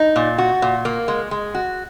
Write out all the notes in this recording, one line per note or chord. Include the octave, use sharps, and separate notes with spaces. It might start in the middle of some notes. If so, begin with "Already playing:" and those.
Already playing: D#4
A#2
F#4
A#2
A#3
G#3
G#3
F#4